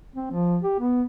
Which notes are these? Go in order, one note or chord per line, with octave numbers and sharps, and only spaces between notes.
C4
F3
G4
B3